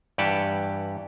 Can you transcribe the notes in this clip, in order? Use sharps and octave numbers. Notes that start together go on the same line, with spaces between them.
G2 E3 G4 F#5 A5